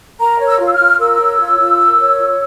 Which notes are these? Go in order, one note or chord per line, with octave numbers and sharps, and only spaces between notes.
A#4 A#5
C#5
E6
F4
E6
F6
F4
A#4 E6
C#5
F4
F4
A#4
C#5
F4